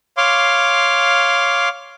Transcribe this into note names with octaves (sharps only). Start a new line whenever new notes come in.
C#5 F5 C6 D6